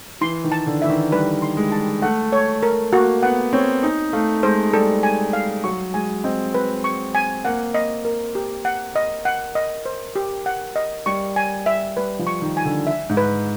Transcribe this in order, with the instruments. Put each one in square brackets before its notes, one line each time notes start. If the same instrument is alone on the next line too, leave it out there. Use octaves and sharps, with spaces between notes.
[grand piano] E3 [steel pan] C6
[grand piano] D#3
[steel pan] A5
[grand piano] D3
[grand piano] E3 [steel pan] E5
[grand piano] D#3
[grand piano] G3 [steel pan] B4
[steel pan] C6
[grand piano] G#3
[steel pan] A5
[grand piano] A3 [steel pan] F#5
[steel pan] C#5
A#4
[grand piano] A#3 [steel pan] F#4
[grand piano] B3 [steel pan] F#5
[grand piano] C4 [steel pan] C#5
[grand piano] D#4 [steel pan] G#5
[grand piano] A3 [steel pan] F5
[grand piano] G#3 [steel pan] C5
[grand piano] G3 [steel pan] A4
[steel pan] G#5
F5
[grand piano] F#3 [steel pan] C#6
[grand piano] G#3 [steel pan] G#5
[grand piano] C4 [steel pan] D#5
[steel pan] B4
C#6
G#5
[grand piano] A#3 [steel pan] F#5
[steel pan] D#5
A#4
G4
F#5
D#5
F#5
D#5
C5
G4
F#5
D#5
[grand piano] G3 [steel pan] C#6
[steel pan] G#5
E5
[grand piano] G3 [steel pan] B4
[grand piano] F3
[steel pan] C#6
[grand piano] D#3
[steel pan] G#5
[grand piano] D3
[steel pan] E5
[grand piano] G#2
[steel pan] B4